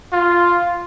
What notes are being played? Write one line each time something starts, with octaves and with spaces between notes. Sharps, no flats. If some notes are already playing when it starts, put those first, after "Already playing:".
F4